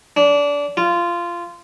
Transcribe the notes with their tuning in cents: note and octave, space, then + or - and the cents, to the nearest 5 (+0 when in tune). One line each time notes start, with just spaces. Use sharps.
D4 -25
F4 -15